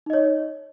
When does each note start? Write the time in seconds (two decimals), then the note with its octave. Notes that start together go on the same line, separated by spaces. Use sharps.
0.06 D#4
0.10 D#5
0.13 C#5